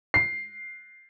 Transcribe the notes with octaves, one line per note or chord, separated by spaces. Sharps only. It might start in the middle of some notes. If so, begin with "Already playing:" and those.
C7